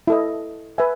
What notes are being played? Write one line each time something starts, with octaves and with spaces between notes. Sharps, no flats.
E4 A4 D#5
B4 E5 G#5